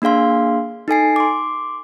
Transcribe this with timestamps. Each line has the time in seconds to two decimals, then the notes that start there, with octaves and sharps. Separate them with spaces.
0.02 A#3 D4 G#4 F5 C6
0.88 D#4 A4 G#5 C7
1.16 C6 D6